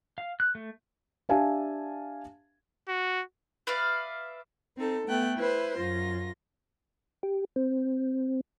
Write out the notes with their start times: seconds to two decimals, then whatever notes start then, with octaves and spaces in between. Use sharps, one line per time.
0.18 F5
0.40 F#6
0.55 A3
1.29 D4 G4 E5 F5 G#5 A5
2.88 F#4
3.67 B4 D5 E5 F5
4.76 C4 D#4 A4
5.06 A3 B3 G5 F#6
5.36 E4 B4 C5
5.77 F#2 F4 A#6
7.23 G4
7.56 C4